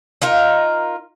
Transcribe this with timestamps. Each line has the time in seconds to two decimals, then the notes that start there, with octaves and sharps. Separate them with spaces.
0.22 D#4 F4 A#4